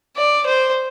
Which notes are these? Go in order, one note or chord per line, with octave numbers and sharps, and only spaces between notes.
D5
C5